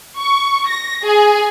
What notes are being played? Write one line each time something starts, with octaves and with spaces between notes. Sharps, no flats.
C#6
A#6
G#4